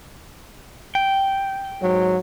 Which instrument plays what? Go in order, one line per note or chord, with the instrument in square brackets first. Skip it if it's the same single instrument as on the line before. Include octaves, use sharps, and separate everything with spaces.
[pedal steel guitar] G5
[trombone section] G#2 F#3